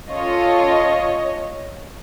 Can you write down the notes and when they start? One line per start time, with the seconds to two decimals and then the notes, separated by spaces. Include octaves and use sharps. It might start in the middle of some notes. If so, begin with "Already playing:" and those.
0.11 C#4 F4 A4 C#5 D#5